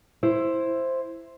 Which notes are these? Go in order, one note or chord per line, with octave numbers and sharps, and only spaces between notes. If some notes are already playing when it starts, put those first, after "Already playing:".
E4 C5